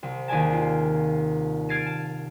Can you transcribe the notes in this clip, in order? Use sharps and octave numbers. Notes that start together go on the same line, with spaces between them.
C2
D#2 G#4 D5 G#5 A5
F4
F6 G#6 A6 C7 D7 D#7
A5